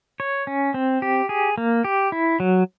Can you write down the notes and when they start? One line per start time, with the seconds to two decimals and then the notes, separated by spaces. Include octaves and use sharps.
0.20 C#5
0.47 C#4
0.74 C4
1.02 G4
1.29 G#4
1.58 A#3
1.84 G4
2.12 E4
2.40 F#3